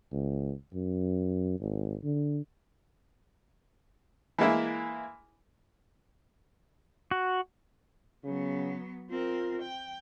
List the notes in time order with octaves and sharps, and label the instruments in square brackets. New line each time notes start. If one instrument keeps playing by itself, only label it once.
[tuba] C#2
F#2
G#1
D3
[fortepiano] E3 G#3 A#3 E4
[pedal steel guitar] F#4
[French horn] C#3 [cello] F#3 B3
[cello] C4 A#4 [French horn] F4
[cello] G5